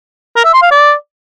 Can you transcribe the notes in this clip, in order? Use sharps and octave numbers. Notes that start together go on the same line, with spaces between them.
A#4
E5
C6
F5
D5